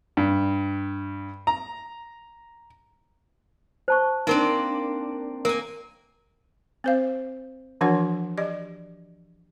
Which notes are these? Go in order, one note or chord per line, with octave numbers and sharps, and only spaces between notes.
G2
A#5
C5 A5 C#6
A#3 C4 D4 D#4 A#4
A#3 A#4 G#5
C4 C5 F5
E3 F3 D4 F#4 C#5 F#5
G4 D5 D#5